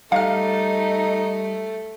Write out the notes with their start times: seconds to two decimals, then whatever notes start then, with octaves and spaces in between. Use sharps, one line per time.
0.12 G3 A3 D#4 F5 F6